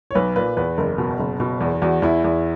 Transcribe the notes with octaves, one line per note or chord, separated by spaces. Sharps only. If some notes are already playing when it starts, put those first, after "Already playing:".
C#5
B1 B4
A#2 B4
E2 B4
F#1 A#4
B2
F#1
B2
E2
E2 F#4
E2 E4
E2